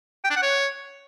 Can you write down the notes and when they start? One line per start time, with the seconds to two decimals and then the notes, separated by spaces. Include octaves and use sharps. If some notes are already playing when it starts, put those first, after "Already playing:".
0.25 G5
0.30 D4
0.36 F#5
0.42 C#5